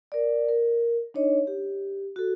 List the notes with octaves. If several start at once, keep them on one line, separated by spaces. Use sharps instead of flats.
A#4 D5
A#4
D4 D#4 C#5 D#5
G4
F#4 A4